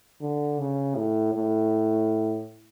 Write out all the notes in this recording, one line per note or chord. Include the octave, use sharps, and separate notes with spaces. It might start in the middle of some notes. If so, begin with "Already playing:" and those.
D3
C#3
A2
A2